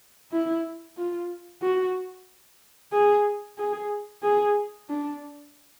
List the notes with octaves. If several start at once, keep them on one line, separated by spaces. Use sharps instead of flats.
E4
F4
F#4
G#4
G#4
G#4
D4